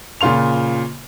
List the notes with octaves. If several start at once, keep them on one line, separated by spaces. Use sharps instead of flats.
A#2 C#3 F4 C6 F7